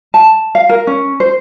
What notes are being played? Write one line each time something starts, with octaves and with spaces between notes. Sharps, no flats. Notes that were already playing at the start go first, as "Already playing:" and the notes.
A5
F5
A#4
C#4
C5